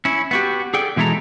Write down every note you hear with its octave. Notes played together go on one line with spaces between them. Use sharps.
C#4 E4
B3 F#4 G4
G#4 A4 D5 G5
B2 E3 G#3 E4 A4 A#5